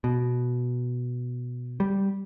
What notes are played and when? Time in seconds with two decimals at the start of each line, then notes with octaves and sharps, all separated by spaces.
0.04 B2
1.80 G3